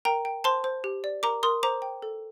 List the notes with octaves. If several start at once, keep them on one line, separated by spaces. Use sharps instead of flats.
A#4 G5 A#5
G5
C5 A5 C6
C5
G4
D5
A#4 A#5 D6
A#4 C6 D#6
C5 A#5 D6
G5
A4